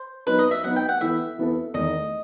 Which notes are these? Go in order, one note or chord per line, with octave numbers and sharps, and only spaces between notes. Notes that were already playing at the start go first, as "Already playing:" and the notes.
Already playing: C5
F#3 B3 D#4 B4
D#5
E5
F#3 B3 D#4 F#5
G5
F#5
E3 B3 E4 A4 E5
E3 B3 E4 A4
E2 D#3 A3 D#5